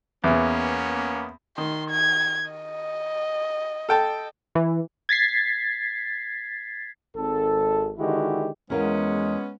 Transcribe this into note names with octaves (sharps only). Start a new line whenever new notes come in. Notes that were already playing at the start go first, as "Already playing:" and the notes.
E2 A#3 B3 C#4
D#3 C6
G#6
D#5
A4 G5 A5
E3
G#6 A6 B6 C7
G#1 A4
D3 D#3 G#3 E4 F#4 G4
E2 G#3 B3 C#4 A#4 F5